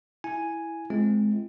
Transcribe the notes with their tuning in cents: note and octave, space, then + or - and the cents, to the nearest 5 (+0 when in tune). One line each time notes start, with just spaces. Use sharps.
E4 +0 G#5 +0
G#3 +25 C4 -5 F4 -45